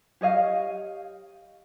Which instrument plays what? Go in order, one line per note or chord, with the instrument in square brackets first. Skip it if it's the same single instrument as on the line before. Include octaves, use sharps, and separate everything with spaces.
[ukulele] G4 C#5 D#5 F5